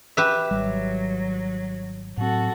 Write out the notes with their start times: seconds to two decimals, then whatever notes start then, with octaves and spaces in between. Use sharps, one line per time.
0.17 G4 B4 E5
0.51 G#1 F#3 G3
2.17 A2 F#3 C4 F#4 A4